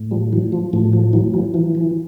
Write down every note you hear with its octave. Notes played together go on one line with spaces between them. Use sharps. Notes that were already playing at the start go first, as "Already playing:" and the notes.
Already playing: A2
F3 G3
E3 F#3
F3
A2 F3
F3
E3 F#3
E3 F#3
E3 F3
F3